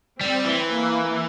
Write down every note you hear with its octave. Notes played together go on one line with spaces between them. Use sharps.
G3 C4
E3
A#3